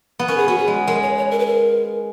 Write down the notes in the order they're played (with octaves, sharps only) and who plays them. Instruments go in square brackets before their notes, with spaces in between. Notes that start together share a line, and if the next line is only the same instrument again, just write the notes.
[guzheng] B3
[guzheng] C#4 [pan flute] A#4
[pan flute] G#4
[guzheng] B3 [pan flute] F#4
[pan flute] G#4
[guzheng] G#3
[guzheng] G#3 [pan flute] A#4
[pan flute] C#5
C#5
A#4
B4
A#4